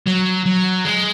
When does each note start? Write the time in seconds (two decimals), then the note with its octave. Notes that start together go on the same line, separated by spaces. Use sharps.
0.07 F#3
0.46 F#3
0.85 G#3